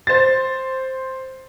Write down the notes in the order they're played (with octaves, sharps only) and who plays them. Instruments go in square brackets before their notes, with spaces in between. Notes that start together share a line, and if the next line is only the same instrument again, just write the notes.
[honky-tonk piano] C5 A6